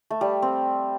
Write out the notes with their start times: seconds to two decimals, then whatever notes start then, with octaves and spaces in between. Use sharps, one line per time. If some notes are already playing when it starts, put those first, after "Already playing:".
0.10 A3
0.21 G3
0.42 C4